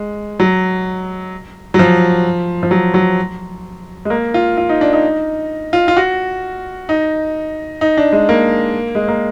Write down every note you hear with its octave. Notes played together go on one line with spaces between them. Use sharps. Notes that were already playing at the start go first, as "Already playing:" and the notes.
Already playing: G#3
F#3
F#3
F3
F3
F#3
F#3
G#3
A#3
F4
F4
D#4
D4
D#4
F4
F4
F#4
D#4
D#4
D4
G#3
A#3
G#3
A#3